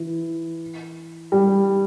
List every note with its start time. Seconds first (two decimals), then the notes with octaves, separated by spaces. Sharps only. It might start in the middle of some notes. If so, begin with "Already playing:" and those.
Already playing: E3
1.32 G3